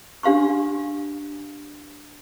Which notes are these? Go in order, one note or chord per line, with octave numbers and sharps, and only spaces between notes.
D4 G4 F5 C6 C#6